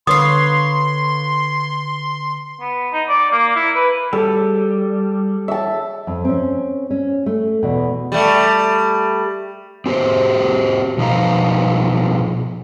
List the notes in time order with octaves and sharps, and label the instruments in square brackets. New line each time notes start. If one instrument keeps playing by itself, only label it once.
[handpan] D3 B4 [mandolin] C#5 F5 [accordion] C6 [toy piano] D#6
[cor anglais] B3
D#4
D5
A#3
E4
B4
[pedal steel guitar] G3 [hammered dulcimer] A4
[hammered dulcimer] E5 A5
[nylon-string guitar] F2
C4 C#4
C#4
A3
E2 B2
[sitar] G3 A3
[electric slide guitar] C4 F#4 G4 C5
B2 F3 D#4 B4 F5 A#5